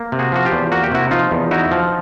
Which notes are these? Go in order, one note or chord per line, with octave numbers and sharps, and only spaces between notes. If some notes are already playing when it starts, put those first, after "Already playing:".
Already playing: A#3
C3
F#4 G#4
F3 F#4
F4 G4
E2
A#3 F#4
G4
C3 E4 F#4
F3 D#4 F4
E2
D#4 E4 F#4
F3